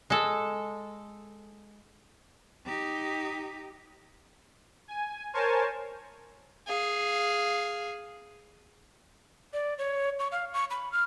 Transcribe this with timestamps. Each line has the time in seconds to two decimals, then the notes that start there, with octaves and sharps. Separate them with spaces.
0.10 G#3 A4
2.66 D#4 G4
4.88 G#5
5.33 A#4 C5 C#5 G#5 A5
6.67 G#4 F5
9.53 D5
9.78 C#5
10.19 C#6
10.32 F5
10.53 C#6
10.70 B5
10.92 F6